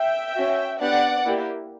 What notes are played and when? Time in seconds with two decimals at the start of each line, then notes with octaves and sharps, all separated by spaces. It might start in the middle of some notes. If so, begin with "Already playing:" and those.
Already playing: E5 G5
0.35 C#4 F#4
0.81 B3 D4 G4 D5 F#5
1.26 A#3 E4 G4